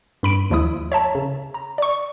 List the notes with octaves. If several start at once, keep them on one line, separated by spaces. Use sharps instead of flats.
G2 B5 D7
D#2 F3 G#3 E4 D#6
C#5 E5 A5 A#5
C#3
A#5
D5 C#6